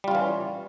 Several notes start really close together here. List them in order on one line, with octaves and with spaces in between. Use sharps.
G3 F4 C#4 E3